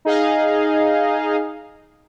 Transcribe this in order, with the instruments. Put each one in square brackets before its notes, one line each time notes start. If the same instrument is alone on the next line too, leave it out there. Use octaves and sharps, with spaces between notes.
[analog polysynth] D#4 G#4 D#5 F5